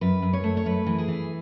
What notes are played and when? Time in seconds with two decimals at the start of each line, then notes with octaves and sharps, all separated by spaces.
0.01 F#2 B4
0.22 F#2
0.33 C#5
0.44 A3
0.57 C#5
0.66 F#2 B4
0.86 E3
0.98 G#4
1.08 E3